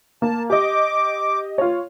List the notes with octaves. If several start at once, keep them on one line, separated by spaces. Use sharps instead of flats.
A#3 A5
G4 D#5 D6
F4 C#5